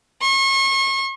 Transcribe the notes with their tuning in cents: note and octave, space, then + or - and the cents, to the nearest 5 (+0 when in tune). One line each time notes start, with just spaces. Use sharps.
C#6 -40